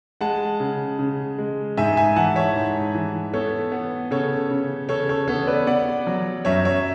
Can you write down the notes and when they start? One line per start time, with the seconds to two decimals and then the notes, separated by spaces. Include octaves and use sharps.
0.21 G#3 F#5 A5
0.60 C#3
0.99 C#3
1.38 G#3
1.77 G#2 E5 G#5
1.97 E5 G#5
2.16 E3 F#5 A5
2.36 C#5 E5
2.56 G#2
2.95 E3
3.34 B3 A4 C#5
3.72 B3
4.11 C#3 A4 C#5
4.51 C#3
4.89 C#3 A4 C#5
5.09 A4 C#5
5.28 B3 A4 C#5
5.47 B4 D5
5.67 B3 D5 F#5
6.07 F#3
6.45 F#2 C#5 E5
6.65 C#5 E5